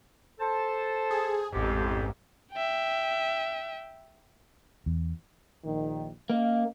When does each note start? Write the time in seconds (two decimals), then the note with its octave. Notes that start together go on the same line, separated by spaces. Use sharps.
0.39 A4 C5 A5
1.11 G#4
1.52 A1 F2 G#2 G4
2.52 E5 G5
4.86 E2
5.65 A#1 D#3
6.30 A#3 C#4 D#5 F5